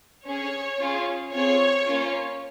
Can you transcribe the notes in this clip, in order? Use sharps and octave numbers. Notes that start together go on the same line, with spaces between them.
C#4 G#4 C#5
C#4 F4 G#4
C4 F4 G#4 C#5
A#3 C#4 F4